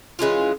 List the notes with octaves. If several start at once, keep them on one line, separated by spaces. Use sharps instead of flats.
E3 G#3 C#4 F4